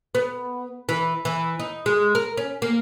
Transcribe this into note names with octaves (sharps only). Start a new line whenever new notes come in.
B3
E3
E3
D#4
G#3
A#4
C#4
A#3